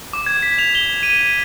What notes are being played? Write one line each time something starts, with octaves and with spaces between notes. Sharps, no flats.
D6
G#6
B6
F7
G7
D#7